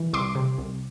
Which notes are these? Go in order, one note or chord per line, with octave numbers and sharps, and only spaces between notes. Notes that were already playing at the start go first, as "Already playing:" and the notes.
Already playing: E3
C2 C6 D6
C3
C2